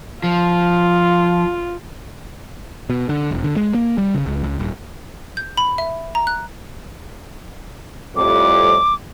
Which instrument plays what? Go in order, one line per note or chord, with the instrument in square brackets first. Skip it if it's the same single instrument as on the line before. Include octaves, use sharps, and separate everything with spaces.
[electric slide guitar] F3 [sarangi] F4
[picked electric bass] B2
D3
E1
D3
G#3
A#3
G3
C#3
C#2
C#2
D#1
[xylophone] G6
B5
E5
A#5
F#6
[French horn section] F2 A2 G3 [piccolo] D6